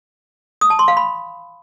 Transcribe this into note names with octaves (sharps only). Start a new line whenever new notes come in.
D#6
A5
C6
F5
B5